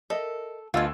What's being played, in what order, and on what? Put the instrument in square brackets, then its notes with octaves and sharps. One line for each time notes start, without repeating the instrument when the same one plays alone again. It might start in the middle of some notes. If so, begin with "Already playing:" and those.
[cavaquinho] A4 [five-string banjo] A#4 D#5 E5
[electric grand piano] D2 E6 G#6 [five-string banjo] B3 D#5 [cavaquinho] F4 A5